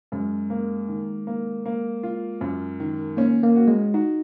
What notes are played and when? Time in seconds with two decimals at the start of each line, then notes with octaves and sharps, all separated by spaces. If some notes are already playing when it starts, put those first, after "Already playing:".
0.12 F#2 G#3
0.50 A#3
0.88 D#3
1.27 A#3
1.66 A#3
2.03 F4
2.41 F#2
2.80 D#3
3.17 A#3 C#4
3.43 A#3
3.56 F#4
3.68 G#3
3.94 D#4 F#4